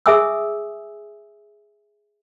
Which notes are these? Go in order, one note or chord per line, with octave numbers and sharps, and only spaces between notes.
G#4 E5 G#5 D#6 E6